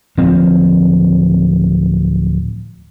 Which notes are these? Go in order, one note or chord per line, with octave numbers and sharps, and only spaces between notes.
D1 F3 C4